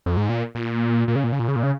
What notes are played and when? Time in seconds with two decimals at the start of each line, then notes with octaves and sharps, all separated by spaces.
0.06 F2
0.17 G#2
0.29 A#2
0.55 A#2
1.08 A#2
1.16 C#3
1.24 A#2
1.32 C#3
1.40 A#2
1.48 C#3
1.56 A#2
1.63 C#3